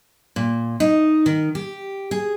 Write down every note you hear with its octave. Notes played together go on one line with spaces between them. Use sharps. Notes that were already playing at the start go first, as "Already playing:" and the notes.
A#2
D#4
D#3
G4
G#4